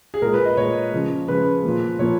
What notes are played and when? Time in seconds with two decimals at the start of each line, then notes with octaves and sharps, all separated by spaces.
0.14 G#4
0.22 A#2 G#3 A#4
0.34 B4
0.45 D#5
0.57 A#2 G#3 C#5
0.93 C#3 F3 G#3
1.28 C#3 F3 G#3 B4
1.64 A#2 F3 A#3
1.99 A#2 F3 A#3 C#5